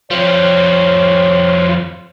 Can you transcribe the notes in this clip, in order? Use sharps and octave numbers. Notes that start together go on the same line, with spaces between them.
F2 G3 F4 C5 C#5